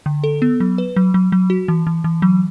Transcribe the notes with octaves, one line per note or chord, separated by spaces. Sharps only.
D3
A4
B3
F#3
B4
F#3
F#3
F#3
F#4
E3
E3
E3
F#3